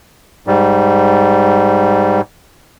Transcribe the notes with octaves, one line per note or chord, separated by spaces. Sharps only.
G#2 G3